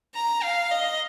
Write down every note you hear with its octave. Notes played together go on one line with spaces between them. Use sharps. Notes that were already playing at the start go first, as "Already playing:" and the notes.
A#5
F5
D#5